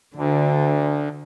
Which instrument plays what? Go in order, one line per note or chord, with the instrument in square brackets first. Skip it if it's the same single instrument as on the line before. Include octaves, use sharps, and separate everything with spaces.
[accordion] D2 [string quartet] D3